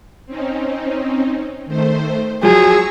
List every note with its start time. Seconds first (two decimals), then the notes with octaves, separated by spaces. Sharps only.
0.26 C4 C#4 D#4
1.66 D#3 A3 C5
2.43 F3 F#3 G#4 A#5 C#6 E6